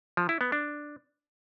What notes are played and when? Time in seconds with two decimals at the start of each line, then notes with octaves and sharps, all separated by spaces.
0.17 F3
0.29 E4
0.41 B3
0.52 D4